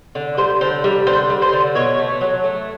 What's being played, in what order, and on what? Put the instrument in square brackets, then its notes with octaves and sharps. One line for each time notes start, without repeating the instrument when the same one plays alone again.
[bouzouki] D3
G3 C5
D3 C5
G3
D3 C5
G3
C5
D3
B2 C#5
A3
F#3
A3